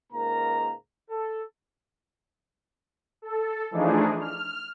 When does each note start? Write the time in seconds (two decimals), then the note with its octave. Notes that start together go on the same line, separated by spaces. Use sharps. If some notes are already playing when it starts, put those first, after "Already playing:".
0.13 C#2 G#2 A#3 A#4 A#5
1.10 A4
3.22 A4
3.71 E3 F3 A3 D4 D#4 G#4
4.20 F6